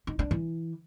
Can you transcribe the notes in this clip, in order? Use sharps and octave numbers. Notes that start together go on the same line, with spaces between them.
D#4
D4
E3